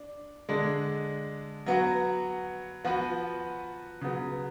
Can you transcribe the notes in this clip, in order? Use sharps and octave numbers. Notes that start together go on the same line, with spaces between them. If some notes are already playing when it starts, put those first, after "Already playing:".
Already playing: D4
D3 G#3 D4
F#3 B3 F#4
F3 B3 F#4 B4
C#3 F#3 B3